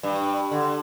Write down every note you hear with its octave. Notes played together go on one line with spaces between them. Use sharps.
G2
D3